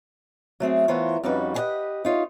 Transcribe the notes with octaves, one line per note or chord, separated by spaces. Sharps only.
F#3 A3 C4 G#4
E3 B3 F4 A#4 C5 C#5
F2 G3 C#4 D#4 F#4 B4
G4 G#4 B4 D5 D#5 F#5
D#4 F4 C#5